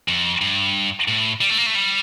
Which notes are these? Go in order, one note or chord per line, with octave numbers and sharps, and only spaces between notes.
F2
G2
A2
G3
A3
A#3
A3
G3